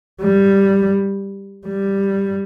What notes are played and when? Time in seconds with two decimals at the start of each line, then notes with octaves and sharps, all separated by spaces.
0.22 G3
1.67 G3